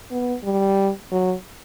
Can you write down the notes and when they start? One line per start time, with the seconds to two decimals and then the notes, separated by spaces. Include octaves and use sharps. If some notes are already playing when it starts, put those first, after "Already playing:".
0.11 B3
0.44 G3
1.12 F#3